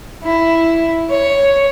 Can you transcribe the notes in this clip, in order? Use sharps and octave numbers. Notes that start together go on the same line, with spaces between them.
E4
C#5